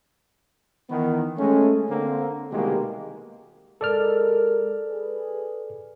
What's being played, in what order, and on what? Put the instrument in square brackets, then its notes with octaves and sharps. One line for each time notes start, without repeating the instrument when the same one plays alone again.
[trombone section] D#3 E3 B3
G#3 A3 C#4
D3 A#3 C4
C2 B2 D#3 G#3 A#3 G4
[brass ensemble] G#3 A#4 [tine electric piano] A4 D5 F6
[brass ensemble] G#4 B4